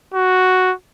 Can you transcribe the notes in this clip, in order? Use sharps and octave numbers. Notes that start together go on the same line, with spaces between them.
F#4